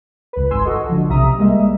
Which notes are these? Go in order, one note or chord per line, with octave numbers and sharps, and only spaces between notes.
C#2 B4
G#1 G#5 C6 E6
F#4 A4 D#5
D3 F3
B1 C3 E5 A#5 D#6
G3 G#3 A#3 D#5 E5